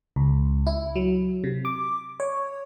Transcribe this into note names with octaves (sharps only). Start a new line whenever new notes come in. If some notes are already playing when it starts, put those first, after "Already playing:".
C#2
E4
F#3
C3
D6
C#5